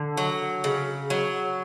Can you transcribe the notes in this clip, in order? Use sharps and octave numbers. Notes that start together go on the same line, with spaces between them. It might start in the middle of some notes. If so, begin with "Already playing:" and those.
Already playing: D3
F#3
C#3
F#3